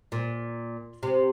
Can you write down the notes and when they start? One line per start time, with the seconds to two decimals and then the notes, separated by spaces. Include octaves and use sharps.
0.12 A#2
1.03 C3